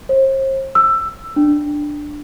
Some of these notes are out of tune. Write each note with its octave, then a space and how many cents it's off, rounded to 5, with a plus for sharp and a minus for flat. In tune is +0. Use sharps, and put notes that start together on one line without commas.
C5 +40
E6 +15
D4 +10